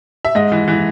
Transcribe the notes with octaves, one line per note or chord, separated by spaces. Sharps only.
E5
G#2 D#5
E3
E3